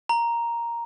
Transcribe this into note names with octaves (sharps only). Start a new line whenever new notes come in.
A#5